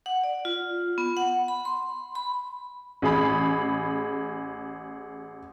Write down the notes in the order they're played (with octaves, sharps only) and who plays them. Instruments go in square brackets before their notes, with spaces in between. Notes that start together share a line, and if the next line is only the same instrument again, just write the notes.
[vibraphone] F#5
D5
F4
B3
F#5
B5
C6
B5
[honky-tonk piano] A1 G#4 B5